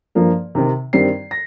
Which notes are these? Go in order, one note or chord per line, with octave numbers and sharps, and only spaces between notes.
G2 F3 A#3
C3 D#3 C4
G2 D#3 G3 C4 C7
A#6